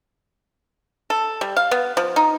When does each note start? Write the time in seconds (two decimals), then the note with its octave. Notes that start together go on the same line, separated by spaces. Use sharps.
1.10 A4
1.41 G3
1.57 F5
1.71 B3
1.97 F3
2.16 D#4